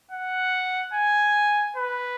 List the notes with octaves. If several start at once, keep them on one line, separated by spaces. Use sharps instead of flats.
F#5
G#5
B4